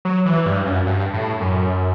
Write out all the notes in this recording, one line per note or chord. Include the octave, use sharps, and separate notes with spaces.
F#3
E3
G2
F#2
G2
A2
F#2